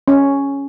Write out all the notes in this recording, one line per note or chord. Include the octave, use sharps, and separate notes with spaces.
C#4